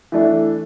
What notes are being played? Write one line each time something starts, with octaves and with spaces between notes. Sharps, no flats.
E3 A3 D4